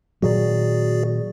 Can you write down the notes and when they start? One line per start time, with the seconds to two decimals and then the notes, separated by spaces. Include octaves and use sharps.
0.22 A#2 D#3 F#3 F#4 G#4 D5